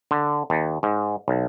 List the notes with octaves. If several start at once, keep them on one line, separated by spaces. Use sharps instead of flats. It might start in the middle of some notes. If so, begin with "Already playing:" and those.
D3
D#2
G#2
B1